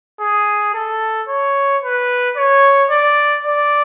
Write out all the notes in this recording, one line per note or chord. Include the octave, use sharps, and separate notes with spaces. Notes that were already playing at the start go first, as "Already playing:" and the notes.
G#4
A4
C#5
B4
C#5
D5
D5